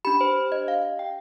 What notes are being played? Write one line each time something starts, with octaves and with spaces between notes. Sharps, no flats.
D4 G4 B5
C5
C5
D#5
F5
G5